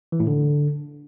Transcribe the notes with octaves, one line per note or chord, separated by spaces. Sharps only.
E3
A2
D3